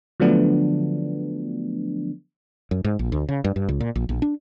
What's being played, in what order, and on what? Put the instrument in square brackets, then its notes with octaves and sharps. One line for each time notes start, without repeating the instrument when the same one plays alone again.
[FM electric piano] D3 F3 F#3 A3 B3 D4
[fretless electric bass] F#2
G#2
A#1
D2
C#3
G2
G2
C#2
A#2
A#1
A#1
D4